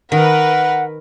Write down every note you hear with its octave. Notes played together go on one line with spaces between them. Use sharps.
D#3 A#4 B4 F#5